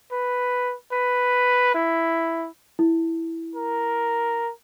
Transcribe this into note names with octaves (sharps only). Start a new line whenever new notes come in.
B4
B4
E4
E4
A#4